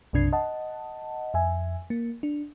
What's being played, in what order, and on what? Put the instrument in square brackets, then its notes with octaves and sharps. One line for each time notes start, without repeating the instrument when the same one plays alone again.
[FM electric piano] B1 F#2 C3 D4 G#6 C7
D#5 F#5 A5
F2 E5 G#5
A#3
D4